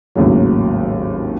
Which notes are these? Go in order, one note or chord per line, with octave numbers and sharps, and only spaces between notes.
G#1 D#2 A2 C#3 F#3